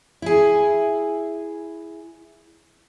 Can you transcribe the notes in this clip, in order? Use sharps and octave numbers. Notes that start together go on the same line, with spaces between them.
E4 G#4